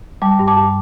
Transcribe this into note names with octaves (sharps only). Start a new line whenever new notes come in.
G3 A5 D6
G2
A5 D6
G2